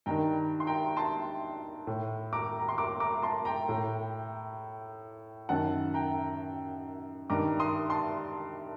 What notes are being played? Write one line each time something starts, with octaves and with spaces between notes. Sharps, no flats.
G2 D#3 G5 A#5
C6
G5 A#5
A5 C6
A2
A#5 D6
A#5
C6
A#5 D6
A#5 D6
A5 C6
G5 A#5
A2
F#2 D#3 F#5 A5
G5 A#5
G2 D#3 A#5 D6
C6 D#6
A5 C6